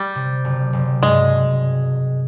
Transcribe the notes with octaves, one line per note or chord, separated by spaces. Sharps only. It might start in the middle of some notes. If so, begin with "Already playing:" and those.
Already playing: G3
C3
F#1
F#1
G2 G#3